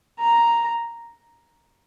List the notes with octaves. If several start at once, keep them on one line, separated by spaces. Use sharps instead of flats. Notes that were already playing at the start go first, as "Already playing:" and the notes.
A#5